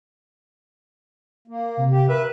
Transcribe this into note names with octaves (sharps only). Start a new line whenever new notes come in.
A#3
C3
G4
A#4 B4 E5